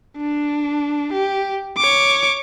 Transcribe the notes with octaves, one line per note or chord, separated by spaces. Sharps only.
D4
G4
C#5 D6